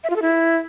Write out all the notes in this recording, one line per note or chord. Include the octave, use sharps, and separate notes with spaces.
E5
F4
A4
E4